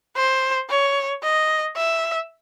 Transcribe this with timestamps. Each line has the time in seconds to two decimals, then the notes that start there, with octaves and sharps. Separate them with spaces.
0.16 C5
0.69 C#5
1.23 D#5
1.76 E5